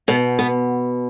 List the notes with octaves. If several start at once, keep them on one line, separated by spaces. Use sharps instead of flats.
B2 B3
B3